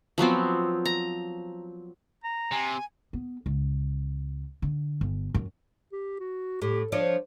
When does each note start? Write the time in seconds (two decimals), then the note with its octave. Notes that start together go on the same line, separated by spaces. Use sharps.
0.18 F3 F#3 B3 C4
0.85 A#5
2.24 A#5
2.52 C3 G#5
3.13 B3
3.46 C#2
4.62 D3
5.01 G1
5.34 F#2
5.93 G4
6.20 F#4
6.62 A2 G4
6.92 F3 D4 C#5